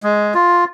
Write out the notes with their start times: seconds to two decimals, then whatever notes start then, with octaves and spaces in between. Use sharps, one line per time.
0.03 G#3
0.34 F4